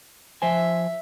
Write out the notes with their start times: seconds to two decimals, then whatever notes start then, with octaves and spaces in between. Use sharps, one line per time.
0.42 F3 C5 E5 G#5